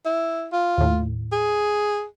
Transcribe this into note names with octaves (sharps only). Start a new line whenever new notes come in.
E4
F4
D#2 A2
G#4